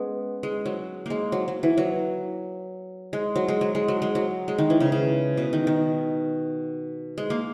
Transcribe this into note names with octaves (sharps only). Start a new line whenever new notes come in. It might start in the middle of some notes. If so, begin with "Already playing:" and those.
Already playing: G#3 B3 C#4
G#3
F#3
G#3 A#3
F#3
F#3
E3
F#3
G#3
F#3
G#3
F#3
G#3
F#3
G#3
F#3
G#3
D#3
E3
C#3
C#3
B2
D#3
D#3
G#3
A#3